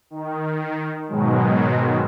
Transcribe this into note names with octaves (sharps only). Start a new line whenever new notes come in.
D#3
G#2 B2 D#3 F#3 G#3